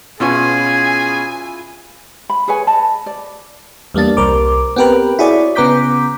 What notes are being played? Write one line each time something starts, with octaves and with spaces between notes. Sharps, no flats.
B2 C#4 E4 F4 G#4 B4 G#5 C#6
B5
G#4 B4 C#5 G#5
D#5 A5 B5
D5
E2 G3 A#3 D4 A6
C2 A#4 C5 D6
B3 C4 G4 A#4 B4
E4 F#4 G#4 C#5 D5
C#3 B3 A#5 D6 G6 B6